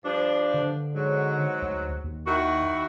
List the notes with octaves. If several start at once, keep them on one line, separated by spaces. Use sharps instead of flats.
G2 F3 D4
D3
G#2 F#3
D2
D#2
D#3 E4 F#4